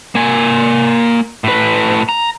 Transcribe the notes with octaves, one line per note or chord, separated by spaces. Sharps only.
A#3 G#5
A2 B4
A#5